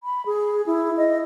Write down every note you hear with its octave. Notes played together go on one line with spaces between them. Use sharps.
B5
G#4
E4
D#5